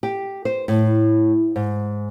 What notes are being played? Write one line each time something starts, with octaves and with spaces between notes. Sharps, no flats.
G4
C5
A2
G#2